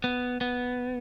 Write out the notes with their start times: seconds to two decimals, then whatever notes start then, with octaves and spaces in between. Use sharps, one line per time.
0.04 B3
0.41 B3